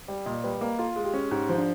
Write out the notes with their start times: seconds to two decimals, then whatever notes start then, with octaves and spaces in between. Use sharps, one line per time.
0.08 G3
0.26 A#2 D#5
0.44 G3 B4
0.61 A#3 A#4
0.79 F4 A4
0.96 G#3
1.05 G4
1.14 C#4
1.31 G#2 G4
1.49 F3
1.58 D4